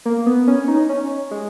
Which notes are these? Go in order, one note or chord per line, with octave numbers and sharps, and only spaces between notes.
A#3
B3
C#4
D#4
C#4
G#3